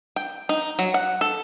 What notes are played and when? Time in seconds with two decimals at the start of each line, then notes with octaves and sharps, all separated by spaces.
0.16 G5
0.49 D#4
0.79 F#3
0.94 F#5
1.21 A4